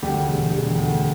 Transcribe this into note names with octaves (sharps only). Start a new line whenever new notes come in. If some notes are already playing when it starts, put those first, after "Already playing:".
D2 G3 G4
E1
E1
D2